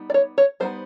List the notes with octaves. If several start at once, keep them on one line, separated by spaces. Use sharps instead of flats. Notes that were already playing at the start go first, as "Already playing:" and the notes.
Already playing: G3 B3 D#4
D5
C#5
C#5
G3 B3 D#4 C5